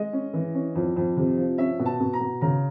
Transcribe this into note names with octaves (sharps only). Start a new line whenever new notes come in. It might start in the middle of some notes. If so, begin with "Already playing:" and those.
Already playing: G#3 D#5
C#4
E3
C#4
F2
F2
C3
F3
C#4 E5
B2
A5
B2
A#5
B2
C#3 A#5